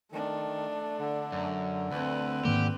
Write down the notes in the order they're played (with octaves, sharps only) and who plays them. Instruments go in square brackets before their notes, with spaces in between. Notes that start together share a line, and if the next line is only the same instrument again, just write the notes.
[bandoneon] D#3 [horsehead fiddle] A3 D4
[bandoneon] D3
[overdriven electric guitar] F#2
[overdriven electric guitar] D2 [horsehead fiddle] C4 B4
[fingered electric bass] G#2 D#3 A#3 [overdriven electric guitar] G4